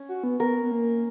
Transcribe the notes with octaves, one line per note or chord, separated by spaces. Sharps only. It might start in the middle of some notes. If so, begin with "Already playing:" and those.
Already playing: C#4
F#4
B3
B3 A#4
B3
A#3